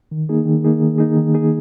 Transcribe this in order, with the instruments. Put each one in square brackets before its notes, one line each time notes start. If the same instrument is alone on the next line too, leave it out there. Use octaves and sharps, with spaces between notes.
[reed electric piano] D#3
A#3 D#4 G#4
D#3
A#3 D#4 G#4
D#3
A#3 D#4 G#4
D#3
A#3 D#4 G#4